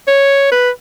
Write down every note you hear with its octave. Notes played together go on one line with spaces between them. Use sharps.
C#5
B4